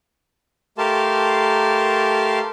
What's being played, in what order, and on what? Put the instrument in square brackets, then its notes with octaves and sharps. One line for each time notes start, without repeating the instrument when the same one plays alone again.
[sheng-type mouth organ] A3 G4 A#4 F5 A5 C6